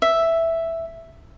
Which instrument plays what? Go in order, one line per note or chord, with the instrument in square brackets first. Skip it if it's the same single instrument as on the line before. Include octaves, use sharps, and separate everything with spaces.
[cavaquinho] E5